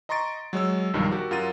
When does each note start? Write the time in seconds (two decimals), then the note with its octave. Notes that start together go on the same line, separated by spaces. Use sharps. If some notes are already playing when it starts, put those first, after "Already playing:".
0.09 D#5 A#5 C6 C#6 A6 D7
0.53 F#3 G#3 C#5 E6
0.94 B1 G2 D#3 F3 G3
1.12 F#4 G4 A#4
1.31 F#2 F4 A#4 F#5 A6 D#7